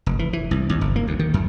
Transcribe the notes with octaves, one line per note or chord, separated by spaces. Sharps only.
F1
E3
E3
C2
D#2
G1
A#3
D2
D#3
F#2